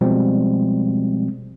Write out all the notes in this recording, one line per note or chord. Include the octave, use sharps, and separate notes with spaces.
B2 F3 G3 G#3 C4